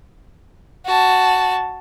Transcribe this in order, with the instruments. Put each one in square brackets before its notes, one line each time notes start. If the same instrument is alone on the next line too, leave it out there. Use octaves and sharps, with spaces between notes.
[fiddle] F#4 A5